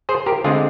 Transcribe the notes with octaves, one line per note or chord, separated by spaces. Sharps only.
G#4 C5
G4 A#4
D3 G#3 C4 F4 G#4